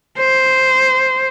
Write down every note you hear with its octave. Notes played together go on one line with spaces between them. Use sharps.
C5